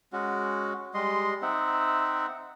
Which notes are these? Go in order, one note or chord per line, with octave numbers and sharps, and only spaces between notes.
G#3 C#4 F#4
G3 G#3 D#5 C6
C4 D#4 E5 F#5